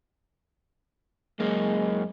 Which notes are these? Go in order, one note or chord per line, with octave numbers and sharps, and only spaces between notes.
F#2 G#3 A#3